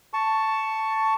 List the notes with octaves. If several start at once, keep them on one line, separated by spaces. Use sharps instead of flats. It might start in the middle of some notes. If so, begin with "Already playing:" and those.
A5 C#6